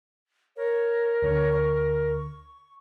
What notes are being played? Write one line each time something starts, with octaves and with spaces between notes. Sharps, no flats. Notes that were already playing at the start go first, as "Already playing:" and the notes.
A#4 C#5
D2 D3 C#5
C#6